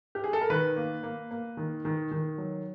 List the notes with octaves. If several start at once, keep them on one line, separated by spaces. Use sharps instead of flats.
G4
G#4
A4
A#4
D#3 B4
A#3
A#3
A#3
D#3
D#3
D#3
F#3